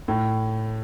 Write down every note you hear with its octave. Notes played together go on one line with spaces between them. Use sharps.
A2